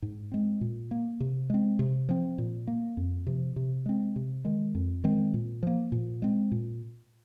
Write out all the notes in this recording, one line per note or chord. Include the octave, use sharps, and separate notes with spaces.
G#2
G#3 C4
A#2
A#3
C3
G#3 C4
C3
F3 C4
A#2
A#3
F2
C3 F3
C3
G#3 C4
C3
D#3 G#3
F2
D#3 G#3 C4
A#2
F3 A#3
A#2
G#3 C4
A#2